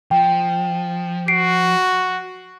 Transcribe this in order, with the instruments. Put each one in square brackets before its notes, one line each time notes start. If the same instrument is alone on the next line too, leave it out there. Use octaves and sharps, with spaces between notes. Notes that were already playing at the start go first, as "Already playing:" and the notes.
[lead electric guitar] F3 [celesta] G5
[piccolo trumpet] F#4 [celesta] C7 D7